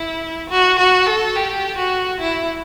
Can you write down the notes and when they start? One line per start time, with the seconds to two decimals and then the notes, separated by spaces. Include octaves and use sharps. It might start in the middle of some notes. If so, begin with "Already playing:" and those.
Already playing: E4
0.50 F#4
0.79 F#4
1.06 A4
1.35 G4
1.78 F#4
2.20 E4